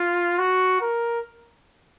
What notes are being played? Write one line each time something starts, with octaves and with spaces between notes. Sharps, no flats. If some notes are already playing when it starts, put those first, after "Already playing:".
Already playing: F4
F#4
A#4